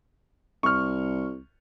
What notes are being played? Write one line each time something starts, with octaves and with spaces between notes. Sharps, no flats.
C2 C#6 F6